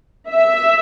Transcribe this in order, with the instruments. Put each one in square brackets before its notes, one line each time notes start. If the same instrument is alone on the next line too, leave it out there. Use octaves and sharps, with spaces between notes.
[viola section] E5